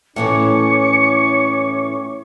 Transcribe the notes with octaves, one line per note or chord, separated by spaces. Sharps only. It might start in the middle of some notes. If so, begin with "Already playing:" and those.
A2 E3 A3 C#4 C#5 C#6 D6 C#7